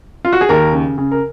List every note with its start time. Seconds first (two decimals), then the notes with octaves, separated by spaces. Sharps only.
0.25 F4
0.33 F#4
0.41 G#4
0.49 D#2 A#4
0.72 C#3
0.98 C#3
1.12 A#4